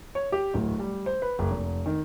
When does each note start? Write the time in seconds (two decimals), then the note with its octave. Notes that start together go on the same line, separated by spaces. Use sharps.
0.15 C#5
0.32 G4
0.54 D1
0.79 G3
1.06 C5
1.22 B4
1.39 F#1
1.51 F1
1.86 D#3